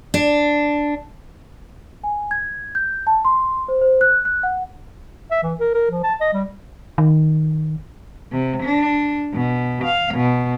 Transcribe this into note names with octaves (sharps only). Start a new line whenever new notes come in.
D4
G#5
G#6
G6
A5
C6
C5
C5
F#6
F#6
F#5
E5
E3
A#4
A#4
F3
A5
D#5
G3
D#3
C3
D4
B2
F5
B2